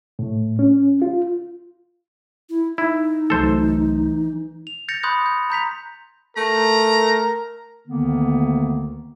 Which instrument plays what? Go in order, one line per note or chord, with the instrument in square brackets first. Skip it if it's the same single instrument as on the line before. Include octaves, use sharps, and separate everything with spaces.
[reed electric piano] A2
C#4
F4
[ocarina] E4
[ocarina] D#4 [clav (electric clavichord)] E4
[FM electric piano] C2 F#3 A3 [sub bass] E3 [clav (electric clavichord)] A4 C5
[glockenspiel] F7
G6 A6 A#6 C#7 F7
B5 C6 D#6 F#6 G6
G6
A#5 G6 B6 F7
[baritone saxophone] A3 [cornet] A#4 [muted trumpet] A#5
[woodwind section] D2 D3 D#3 A#3 B3